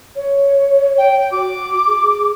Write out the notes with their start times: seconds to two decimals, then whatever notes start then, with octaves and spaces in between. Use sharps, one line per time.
0.16 C#5
0.98 G5
1.32 F#4 D6
1.87 G#4